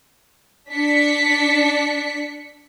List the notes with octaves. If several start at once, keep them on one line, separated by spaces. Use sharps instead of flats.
D4 B6 C#7